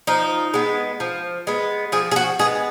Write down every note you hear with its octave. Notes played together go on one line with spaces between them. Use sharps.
F3 D#4
G#3 B3
F3
G#3 B3
F3 G#4
G#4
F#4
G#3 B3 G#4